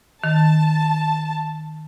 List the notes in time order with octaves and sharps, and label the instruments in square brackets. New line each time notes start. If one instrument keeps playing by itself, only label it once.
[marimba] D#3 [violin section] A5